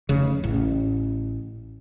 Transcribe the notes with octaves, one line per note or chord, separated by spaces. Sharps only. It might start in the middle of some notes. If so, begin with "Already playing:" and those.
F1 C#3
A1